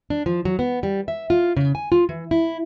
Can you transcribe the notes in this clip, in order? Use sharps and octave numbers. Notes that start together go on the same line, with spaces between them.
D4
F3
F#3
B3
G3
E5
F4
C#3
G#5
F4
E3
E4